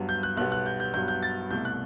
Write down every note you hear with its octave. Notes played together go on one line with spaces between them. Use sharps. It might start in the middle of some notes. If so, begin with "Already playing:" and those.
Already playing: G2 F#3 B3
G6
F#6
B1 B2 G3 B3 F#6
F#6
G6
G6
G2 F#3 B3 G6
G6
A6
C2 B2 A3 G6
F#6